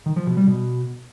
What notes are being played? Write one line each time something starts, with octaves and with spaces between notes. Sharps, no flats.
D#3
F3
B2
G3
B2